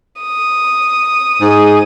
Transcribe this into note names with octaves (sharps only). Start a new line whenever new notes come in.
D#6
G#2 G#4